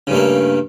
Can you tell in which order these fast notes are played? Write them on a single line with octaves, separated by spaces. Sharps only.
C#3 G2 A3 A#3